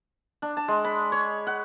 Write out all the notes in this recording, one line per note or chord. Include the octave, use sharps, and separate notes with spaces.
D4
A5
G#3
B5
C#5
F#5